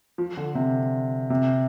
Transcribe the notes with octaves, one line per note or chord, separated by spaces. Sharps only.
F3
D3
C3
C3